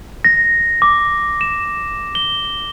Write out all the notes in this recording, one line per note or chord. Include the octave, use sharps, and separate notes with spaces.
A#6
D6
E7
G7